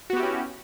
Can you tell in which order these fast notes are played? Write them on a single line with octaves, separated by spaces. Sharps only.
F#4 B3 G4 E4 C#4